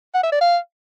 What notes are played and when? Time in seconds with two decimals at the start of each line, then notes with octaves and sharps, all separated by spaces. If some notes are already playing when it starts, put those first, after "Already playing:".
0.14 F#5
0.23 E5
0.32 D5
0.41 F5